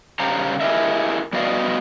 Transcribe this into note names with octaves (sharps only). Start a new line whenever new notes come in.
C#3 G3 G4 C5 F5 A#5
E4 G4 G#4 A#4 D#5 E5
G3 B3 F#4 D5 D#5 F5